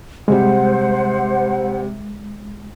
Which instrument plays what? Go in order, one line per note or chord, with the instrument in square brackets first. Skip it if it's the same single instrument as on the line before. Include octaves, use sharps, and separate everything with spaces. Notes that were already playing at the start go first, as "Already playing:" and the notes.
[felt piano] C3 G3 [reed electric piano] G#3 [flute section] C5 F#5